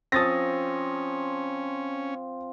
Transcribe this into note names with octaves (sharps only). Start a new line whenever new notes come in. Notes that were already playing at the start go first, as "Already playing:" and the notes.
F3 C4 C#4 D#6 A6 A#6